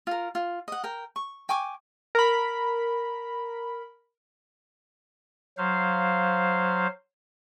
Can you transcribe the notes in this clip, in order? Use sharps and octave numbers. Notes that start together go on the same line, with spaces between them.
F4 A#4
F4
D#5 F#5
A#4 G5
C#6
G5 G#5 C#6 D6
A#4 B5
F#3 C5 F5